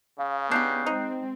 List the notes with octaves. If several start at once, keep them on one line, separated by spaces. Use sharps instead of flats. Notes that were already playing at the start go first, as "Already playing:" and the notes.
C#3 F5
B3 D4 D#4 G4 F#6 G6 C7
G#3 C4 D#4